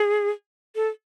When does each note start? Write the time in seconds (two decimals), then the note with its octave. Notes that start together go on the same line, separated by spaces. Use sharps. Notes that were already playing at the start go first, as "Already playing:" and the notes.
Already playing: G#4
0.76 A4